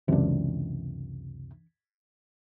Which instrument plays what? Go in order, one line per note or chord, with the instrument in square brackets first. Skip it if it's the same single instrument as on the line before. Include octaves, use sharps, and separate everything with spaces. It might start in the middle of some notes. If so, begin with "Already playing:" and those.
[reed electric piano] C#2 F#2 C3 [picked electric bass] E3 D4